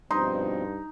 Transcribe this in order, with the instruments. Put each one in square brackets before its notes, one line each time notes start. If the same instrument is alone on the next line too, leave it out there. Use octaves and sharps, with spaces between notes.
[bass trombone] G2 [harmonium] B2 F3 C4 [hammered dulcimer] D#4 [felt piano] C6